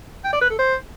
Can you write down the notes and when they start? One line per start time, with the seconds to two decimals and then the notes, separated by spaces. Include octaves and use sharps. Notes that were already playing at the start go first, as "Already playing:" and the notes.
0.24 G5
0.33 D5
0.41 B4
0.50 A4
0.58 C5